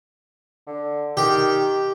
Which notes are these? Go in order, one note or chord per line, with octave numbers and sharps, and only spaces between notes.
D3
D#3 G4